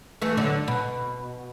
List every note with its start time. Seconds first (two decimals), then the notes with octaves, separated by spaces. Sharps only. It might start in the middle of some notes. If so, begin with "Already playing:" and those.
0.22 E3 A3
0.37 D3 F#3
0.68 B2